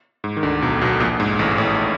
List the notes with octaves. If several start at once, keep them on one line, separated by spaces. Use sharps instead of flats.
G#2
D#3
D2 D3
B1 B2
B1 B2
A#1 A#2
G#2
A1 A2
A1 A2